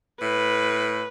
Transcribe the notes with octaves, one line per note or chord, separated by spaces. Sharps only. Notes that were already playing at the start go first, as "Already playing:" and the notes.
A2 B4